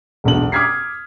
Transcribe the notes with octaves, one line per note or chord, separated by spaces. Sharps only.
E1 B1 D4 F#7
D6 D#6 F6 G#6 B6 C7